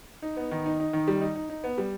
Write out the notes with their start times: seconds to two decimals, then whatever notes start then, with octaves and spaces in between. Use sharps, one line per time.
0.22 D#4
0.37 B3
0.51 D#3
0.66 D#4
0.80 D#4
0.93 D#3
1.08 G3
1.21 D#4
1.36 D#4
1.50 D#4
1.64 B3
1.78 G3